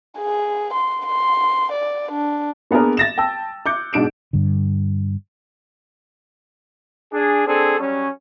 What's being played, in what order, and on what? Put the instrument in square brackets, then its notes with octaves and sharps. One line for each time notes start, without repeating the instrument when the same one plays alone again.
[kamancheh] G#4
C6
C6
D5
D4
[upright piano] A#3 B3 D4 G#4 A#4
A6 A#6 E7
G5 A5 E6
D6 F#6 G6 C#7
G#2 B2 D4 D7 E7
[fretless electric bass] G2 D3
[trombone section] D4 G#4
C4 D4 G#4 A4
F#3 G3 C#4